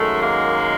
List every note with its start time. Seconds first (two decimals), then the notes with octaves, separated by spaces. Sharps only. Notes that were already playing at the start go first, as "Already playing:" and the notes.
Already playing: F#2 D#3 G#3 A3
0.22 A#3